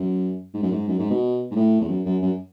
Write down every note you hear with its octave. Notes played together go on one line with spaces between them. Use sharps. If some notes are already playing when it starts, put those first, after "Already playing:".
Already playing: F#2
G#2
F#2
G#2
F#2
G#2
B2
G#2
A2
E2
F#2
F#2
F#2